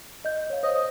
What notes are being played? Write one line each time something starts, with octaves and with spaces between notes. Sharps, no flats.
D#5 G6
C#5 F5
C5 C#5 D#5 F5
D#5